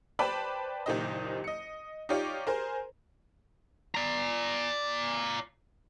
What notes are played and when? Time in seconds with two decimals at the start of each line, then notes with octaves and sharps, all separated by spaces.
0.19 B4 C5 D5 G5 A5 B5
0.86 F#1 A#2 D#3 G4 C5 D#5
1.44 D#5 C#7
2.09 D#4 F4 G4 C#5 D5
2.47 G#4 A#4 C5
3.95 D5 A#5